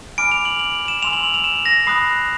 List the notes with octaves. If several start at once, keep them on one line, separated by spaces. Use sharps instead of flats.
G#5 B5 D6 F6 D7
F7
F#7
F#7
F7
E7
G#5 C6 E6 F7
F#7
F#7
F7
E7
A#6
B5 D#6 F#6 C7